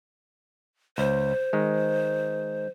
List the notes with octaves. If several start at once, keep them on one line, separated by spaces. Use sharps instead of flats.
C#2 C5
D#3 G#3